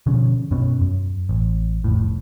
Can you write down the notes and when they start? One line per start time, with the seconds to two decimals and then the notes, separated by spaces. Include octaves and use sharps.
0.06 B2 D3 F3 C#4
0.51 F#2 B2 B3 C#4
0.81 F#2
1.29 A1
1.84 F1 A2